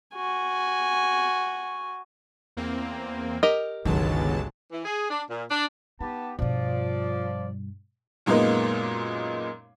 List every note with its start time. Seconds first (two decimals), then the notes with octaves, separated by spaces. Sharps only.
0.15 F#4 G#5
2.57 E2 A#3 C4
3.43 G4 A#4 D#5
3.85 G1 C#2 B2 D#3 F#3 G#3 A5
4.72 E3
4.85 G#4
5.09 D4
5.30 A#2
5.51 D4
6.01 B3 D#4 G4 A5
6.39 G2 B2 F3 D5
8.26 F#2 A#2 G#3 A#3 B3 D#4